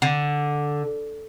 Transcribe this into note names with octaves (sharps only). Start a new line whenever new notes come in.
D3